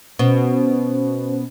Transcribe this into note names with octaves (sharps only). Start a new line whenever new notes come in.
B2 C#4 C5